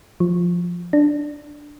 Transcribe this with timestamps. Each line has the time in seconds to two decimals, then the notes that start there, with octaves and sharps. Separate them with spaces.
0.20 F3
0.93 D4